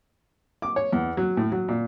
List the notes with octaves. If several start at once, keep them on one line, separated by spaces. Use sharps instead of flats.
D6
C#5
E2
F#3
A2
F#3
A#2